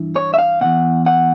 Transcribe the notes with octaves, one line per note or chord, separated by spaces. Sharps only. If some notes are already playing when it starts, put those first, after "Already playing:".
Already playing: G2 E3
C#5
E5
F5
E2 B2 F#5
F#5